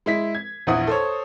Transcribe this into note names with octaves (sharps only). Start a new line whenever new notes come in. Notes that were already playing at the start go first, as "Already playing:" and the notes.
G#3 E4 B6
G#6
A#1 E2 E4 F#5 D#6
A4 C5 C#5